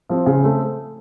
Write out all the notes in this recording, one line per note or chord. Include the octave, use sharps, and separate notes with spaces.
F3 C4
C#3
A3 C4